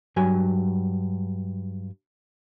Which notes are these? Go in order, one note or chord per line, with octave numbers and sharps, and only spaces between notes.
G2 F#3 G#5